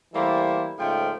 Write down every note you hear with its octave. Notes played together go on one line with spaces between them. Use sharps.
E3 G3 A3 A#3 E4 C5
G#2 C#3 F3 A3 F4 G5